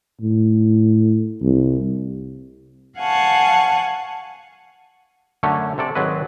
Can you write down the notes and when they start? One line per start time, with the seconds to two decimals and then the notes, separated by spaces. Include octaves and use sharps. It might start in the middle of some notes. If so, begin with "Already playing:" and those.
0.21 A2
1.42 C2
2.99 F5 F#5 G#5 A5 C#6
5.43 F#2 D3 A3 C#4 C#5
5.78 C3 A4 D5 A5
5.95 G#1 F#3 G#3 C4 B4 D#5